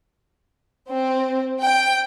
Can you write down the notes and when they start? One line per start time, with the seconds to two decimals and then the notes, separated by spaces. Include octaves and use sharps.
0.89 C4
1.60 G5